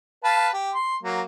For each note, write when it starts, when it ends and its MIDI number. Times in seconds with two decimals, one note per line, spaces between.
0.24 0.49 71
0.24 0.49 77
0.24 0.49 81
0.53 0.72 67
0.74 0.96 84
1.03 1.22 54
1.03 1.22 58